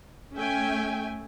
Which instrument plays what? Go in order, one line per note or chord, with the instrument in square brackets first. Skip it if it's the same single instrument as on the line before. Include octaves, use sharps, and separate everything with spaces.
[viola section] A3 C#4 E5 G5 G#5